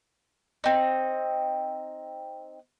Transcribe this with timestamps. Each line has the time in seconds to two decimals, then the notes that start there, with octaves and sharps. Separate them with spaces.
0.64 C4 D#4